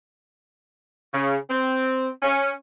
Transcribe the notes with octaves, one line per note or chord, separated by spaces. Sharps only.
C#3
C4
C#4